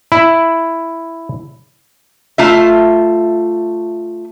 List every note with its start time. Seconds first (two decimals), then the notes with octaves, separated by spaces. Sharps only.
0.12 E4
2.38 A3 F4 E5